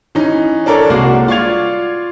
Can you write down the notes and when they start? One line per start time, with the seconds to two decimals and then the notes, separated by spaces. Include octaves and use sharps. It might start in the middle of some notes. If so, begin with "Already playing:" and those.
0.15 E3 C#4 D#4
0.66 D4 A4 A#4 C#5 D5
0.90 C2 G#3 A#3 F#4 D5 F#5
1.28 F4 D5 C#6 G#6 F7